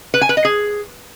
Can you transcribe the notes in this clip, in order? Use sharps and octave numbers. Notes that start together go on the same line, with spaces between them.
B4
G#5
B4
D#5
G#4